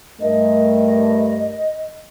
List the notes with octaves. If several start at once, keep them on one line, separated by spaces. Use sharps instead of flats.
G2 A3 A#4 D#5